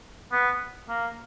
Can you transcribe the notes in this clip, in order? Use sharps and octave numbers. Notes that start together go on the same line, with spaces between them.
B3
A#3